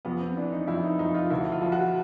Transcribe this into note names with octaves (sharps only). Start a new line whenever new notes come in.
F2 B3
C4
E3 D4
D#4
F2 E4
D#4
F2 D#4
F4
D2 E4
F4
F3
F#4